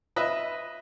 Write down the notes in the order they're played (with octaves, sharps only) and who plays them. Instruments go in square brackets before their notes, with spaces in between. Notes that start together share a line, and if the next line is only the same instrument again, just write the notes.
[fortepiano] F4 B4 D#5 E5